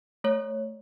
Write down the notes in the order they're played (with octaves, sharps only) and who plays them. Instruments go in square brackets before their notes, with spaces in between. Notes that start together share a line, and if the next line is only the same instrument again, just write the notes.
[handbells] A3 C#5